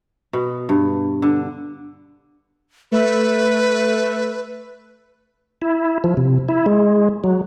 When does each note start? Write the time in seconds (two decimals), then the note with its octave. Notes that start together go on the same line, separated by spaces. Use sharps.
0.33 B2
0.69 G2
1.22 D3
2.92 A3 B4 E5 B5
5.62 E4
6.04 F3
6.17 C3
6.49 E4
6.66 G#3
7.24 F#3